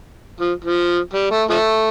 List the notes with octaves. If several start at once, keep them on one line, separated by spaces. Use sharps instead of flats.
F3
F3
G3
A3
F3 A3